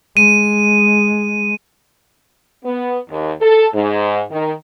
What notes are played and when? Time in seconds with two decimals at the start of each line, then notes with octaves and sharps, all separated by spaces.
0.17 G#3 D#7
2.64 B3
3.10 D#2
3.41 A4
3.74 G#2
4.32 D#3